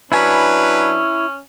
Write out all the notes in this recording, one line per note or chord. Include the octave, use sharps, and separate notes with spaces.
F#3 C#4 D4 E4 B4 G#5 B5